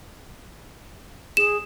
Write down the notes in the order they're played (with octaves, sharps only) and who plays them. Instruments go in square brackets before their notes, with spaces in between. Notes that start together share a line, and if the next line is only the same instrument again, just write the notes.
[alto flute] G#4 [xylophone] E7